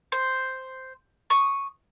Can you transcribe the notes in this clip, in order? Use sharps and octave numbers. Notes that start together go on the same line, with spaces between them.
C5
C#6 D#6